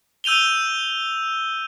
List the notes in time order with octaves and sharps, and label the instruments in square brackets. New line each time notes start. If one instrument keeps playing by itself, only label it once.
[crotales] E6 G6 D#7 F7 G7